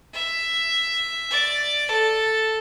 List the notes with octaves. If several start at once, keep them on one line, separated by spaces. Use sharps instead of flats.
E5
D5
A4